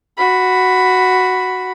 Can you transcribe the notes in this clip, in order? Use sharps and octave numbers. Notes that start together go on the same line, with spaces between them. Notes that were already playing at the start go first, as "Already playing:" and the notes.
F#4 B5